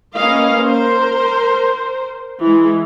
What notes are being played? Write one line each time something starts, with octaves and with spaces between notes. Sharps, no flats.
A#3 C#4 B4 D#5 F5
A#4 C5
E3 G#3